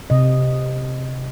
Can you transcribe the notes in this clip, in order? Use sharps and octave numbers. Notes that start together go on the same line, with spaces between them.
C3 D#5